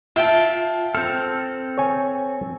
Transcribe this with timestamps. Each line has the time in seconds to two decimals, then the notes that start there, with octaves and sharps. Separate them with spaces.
0.16 F4 E5 G5 A5
0.95 C4 A4 F6
1.78 C#5 G#5